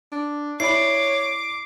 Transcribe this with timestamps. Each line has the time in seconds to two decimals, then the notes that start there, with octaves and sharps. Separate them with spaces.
0.12 D4
0.60 E4 C#5 D5 B5 D6 C7